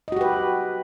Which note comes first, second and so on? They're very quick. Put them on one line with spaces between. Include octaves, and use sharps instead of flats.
D#5 F#4 G4 B4